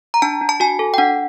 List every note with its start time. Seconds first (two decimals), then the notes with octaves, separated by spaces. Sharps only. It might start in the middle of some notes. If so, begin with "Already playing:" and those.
0.14 A#5
0.22 D4 A5
0.41 D4
0.49 A5
0.60 F#4 G#5
0.79 A4
0.94 G5
0.98 D4 F#5